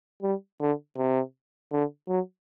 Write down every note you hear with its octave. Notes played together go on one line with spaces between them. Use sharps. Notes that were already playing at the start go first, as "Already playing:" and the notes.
G3
D3
C3
D3
F#3